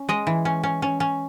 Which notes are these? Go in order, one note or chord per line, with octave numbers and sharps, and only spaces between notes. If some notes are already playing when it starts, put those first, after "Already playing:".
Already playing: C#4
G#3 D#5
E3
C#4
C#4
C#4
C#4